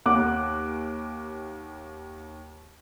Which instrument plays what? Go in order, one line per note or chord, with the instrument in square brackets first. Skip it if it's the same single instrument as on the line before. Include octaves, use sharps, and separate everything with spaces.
[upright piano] D#2 [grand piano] F#5 D6 F#6